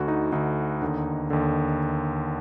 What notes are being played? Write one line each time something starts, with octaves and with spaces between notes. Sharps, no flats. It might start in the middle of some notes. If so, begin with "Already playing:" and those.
Already playing: D2 D3 F#4
D#4
D2 D3 D#4
D#2 D3
D#2 D3